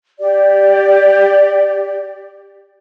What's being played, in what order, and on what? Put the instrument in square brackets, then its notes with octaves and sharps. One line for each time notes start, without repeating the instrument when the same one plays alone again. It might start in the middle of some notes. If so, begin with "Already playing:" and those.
[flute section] G4 D5